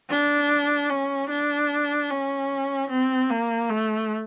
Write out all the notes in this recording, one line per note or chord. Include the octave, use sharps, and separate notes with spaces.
D4
C#4
D4
C#4
C4
A#3
A3